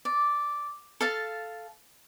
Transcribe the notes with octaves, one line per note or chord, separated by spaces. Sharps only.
D5
A4 F5 A5